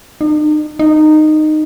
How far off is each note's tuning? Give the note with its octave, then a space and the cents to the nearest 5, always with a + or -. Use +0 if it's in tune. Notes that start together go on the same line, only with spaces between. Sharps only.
D#4 -45
D#4 -15